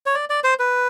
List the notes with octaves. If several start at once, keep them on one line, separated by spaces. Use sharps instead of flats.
C#5
D5
D5
C5
B4